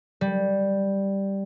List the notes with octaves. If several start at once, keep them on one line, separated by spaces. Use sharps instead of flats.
G3